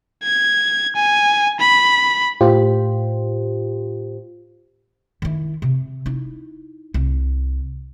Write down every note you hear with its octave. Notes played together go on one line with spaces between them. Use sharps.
G#6
G#5
B5
A2 F4 G4 C5
D#3 E4
C3
D#4 E4
C2